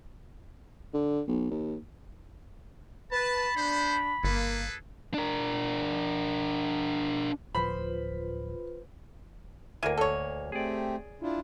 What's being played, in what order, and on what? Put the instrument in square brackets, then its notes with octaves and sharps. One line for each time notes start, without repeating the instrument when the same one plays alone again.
[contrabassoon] D3
B1
D#2
[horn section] B4 [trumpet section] A5 [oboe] B5
[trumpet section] B3 C5 [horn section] D4
[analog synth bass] G1 [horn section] A#3 [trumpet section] G#4 A4 B4
[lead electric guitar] D4 A#4
[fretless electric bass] D1 F3 [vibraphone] F4 B4 [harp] C5 [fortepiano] B5
[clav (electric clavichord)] D2 A#3 G#5 [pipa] E4 A#4
[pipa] A4 C#5
[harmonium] A3 C4 G4 [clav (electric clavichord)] G#4 D5
[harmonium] D4 E4 F4